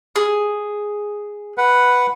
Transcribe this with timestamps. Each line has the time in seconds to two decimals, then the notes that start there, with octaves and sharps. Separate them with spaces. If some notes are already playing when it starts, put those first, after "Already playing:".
0.16 G#4
1.58 B4 F#5